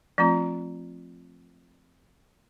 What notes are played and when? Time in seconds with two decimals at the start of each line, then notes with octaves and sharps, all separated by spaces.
0.18 F3 A3 C4 F4